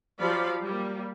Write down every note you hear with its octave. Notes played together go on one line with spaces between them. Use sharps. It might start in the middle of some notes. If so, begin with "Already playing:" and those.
F3 F#3 G4 D5 F5 B5
G3 A#3